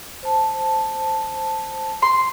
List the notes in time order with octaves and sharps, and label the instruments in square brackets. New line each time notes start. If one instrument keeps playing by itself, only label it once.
[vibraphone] C5 A5
[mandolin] C6